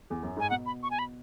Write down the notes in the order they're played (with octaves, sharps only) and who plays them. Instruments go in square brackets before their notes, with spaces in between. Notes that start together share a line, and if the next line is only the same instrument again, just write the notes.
[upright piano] E2
F#2
[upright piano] G#2 [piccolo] G#5
[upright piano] B2 [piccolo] F#5
[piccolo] B5
C#6
G#5
B5